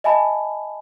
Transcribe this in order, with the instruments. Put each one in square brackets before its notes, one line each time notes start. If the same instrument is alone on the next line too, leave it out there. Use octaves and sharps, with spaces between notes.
[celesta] D#5 E5 G#5 A5 B5